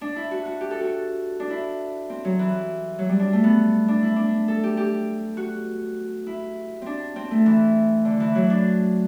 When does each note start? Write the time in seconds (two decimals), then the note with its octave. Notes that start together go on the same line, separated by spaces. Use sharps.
0.01 D4
0.16 E4
0.31 F#4
0.45 F#4
0.61 G4
0.71 A4
0.81 F#4
1.40 D4
1.50 E4
2.10 C4
2.25 F#3
2.39 E3
2.99 F#3
3.09 G3
3.19 D4
3.33 A3
3.44 B3
3.88 D4
4.03 E4
4.16 D4
4.48 A4
4.63 G4
4.77 G4
5.37 F#4
6.27 E4
6.82 C4 D4
7.16 C4
7.31 A3
7.46 E3
8.05 D3
8.20 E3
8.35 F#3
8.50 D4